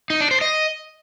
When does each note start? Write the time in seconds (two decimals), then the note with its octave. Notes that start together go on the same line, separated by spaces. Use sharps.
0.10 D#4
0.20 D4
0.31 C5
0.41 D#5